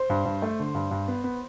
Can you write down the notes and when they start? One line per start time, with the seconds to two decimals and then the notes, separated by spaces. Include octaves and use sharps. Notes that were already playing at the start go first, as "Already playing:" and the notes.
Already playing: C5 C6
0.10 G2
0.25 G2
0.42 A3
0.59 D3
0.75 G2
0.91 G2
1.08 B3
1.24 B3